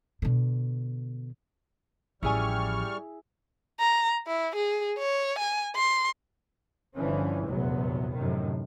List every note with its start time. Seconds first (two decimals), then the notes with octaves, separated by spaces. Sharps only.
0.22 B2 D3
2.23 A1 F3 G3 E4 G#4 G#5 C#6 F6
3.80 A#5
4.27 E4
4.56 G#4
4.99 C#5
5.39 G#5
5.76 C6
6.95 G1 D3 E3 F3 C#4
7.46 F1 A#1 E2 C3 F#3 B3
8.13 F#2 A2 C3 D#3